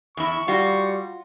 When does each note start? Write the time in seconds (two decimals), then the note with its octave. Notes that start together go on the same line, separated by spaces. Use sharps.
0.17 E2 E4 C#6
0.48 G3 F4 F#4